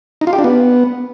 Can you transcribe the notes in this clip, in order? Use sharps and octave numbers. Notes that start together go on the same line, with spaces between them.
D#4
F4
G4
D4
B3